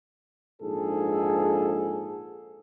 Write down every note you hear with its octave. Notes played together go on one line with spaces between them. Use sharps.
A#1 G#2 G#4 A4